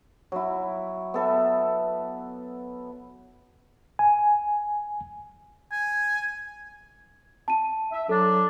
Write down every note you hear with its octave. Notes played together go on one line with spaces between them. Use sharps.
F#3 E4
B3 A4 E5
G#5
G#5
A5 D#7
E5
F#3 D4 A4